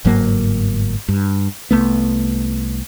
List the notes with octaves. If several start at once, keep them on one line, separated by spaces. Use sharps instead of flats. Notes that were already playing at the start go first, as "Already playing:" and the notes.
G1 G#2 F#3 A#3
G2
C2 A3 B3